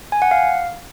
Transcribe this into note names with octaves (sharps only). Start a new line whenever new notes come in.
G#5
F#5
F5